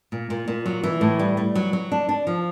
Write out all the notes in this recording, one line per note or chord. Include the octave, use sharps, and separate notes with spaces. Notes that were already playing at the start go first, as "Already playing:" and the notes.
A#2
A#2
A#2
F#3
E3
A2
G3
G3
F#3
F#3
D4
D4
F3